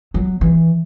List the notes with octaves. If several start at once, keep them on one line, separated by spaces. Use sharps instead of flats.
F#3
E3